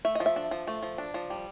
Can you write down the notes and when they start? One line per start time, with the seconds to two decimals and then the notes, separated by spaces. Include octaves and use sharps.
0.05 A3 E5
0.15 F3 D#5
0.26 E5
0.36 D4
0.51 F3
0.67 A3
0.83 F3
0.98 D4
1.14 F3
1.30 G3